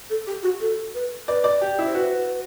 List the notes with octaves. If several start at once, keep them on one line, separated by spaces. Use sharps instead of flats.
A4
G4
F#4
A4
B4
B4 D5
D5
G4
E4
C5
F#4 B4